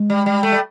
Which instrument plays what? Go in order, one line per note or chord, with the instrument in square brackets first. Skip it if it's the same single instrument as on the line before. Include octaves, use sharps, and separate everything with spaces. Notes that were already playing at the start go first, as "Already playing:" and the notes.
Already playing: [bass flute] G#3
[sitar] G3
G3
A3
G3